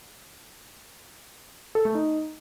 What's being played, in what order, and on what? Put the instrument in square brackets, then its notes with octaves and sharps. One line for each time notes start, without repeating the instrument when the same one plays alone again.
[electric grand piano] A4
A3
D#4